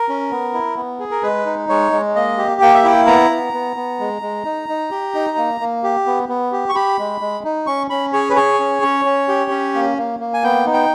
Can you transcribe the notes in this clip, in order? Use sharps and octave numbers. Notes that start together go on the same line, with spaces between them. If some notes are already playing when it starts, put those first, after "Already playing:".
Already playing: A#4
C#4
B3
E4
B3
G#4
A#4
G#3 B4
D#4
G#3 C#5
G#3
A#3 D#5
G4
A#3 G5
E5
E4 G5
B3 A#5
B3
B3
B3
G#3
G#3
D#4
D#4
G4
D#4
A#3
A#3
G4
B3
B3
G4
C#6
G4 B5
G#3
G#3
D#4
C#4 C#6
C#4 B5
G#4 C#5
B4
G#4 C#5
C#4
C#4
C#4
G4
C#4
A#3
A#3
A#3
G#5
B3 G5
D#4
G5